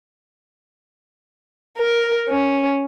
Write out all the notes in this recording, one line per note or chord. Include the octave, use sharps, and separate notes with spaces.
A#4
C#4